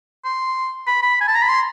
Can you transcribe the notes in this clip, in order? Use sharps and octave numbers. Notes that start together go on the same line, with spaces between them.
C6
B5
B5
G#5
A5
A#5
B5
C6